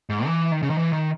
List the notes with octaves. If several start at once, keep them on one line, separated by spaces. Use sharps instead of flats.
G#2
E3
D#3
C#3
D#3
E3
D#3